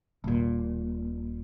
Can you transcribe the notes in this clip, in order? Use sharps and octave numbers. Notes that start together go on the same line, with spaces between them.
D#1 A#2